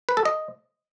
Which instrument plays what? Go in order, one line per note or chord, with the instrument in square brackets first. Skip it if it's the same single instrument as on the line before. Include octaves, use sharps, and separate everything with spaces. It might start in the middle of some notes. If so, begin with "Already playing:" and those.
[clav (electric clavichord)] B4
A4
D#5